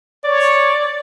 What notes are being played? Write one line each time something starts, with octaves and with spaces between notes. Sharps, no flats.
C#5 D5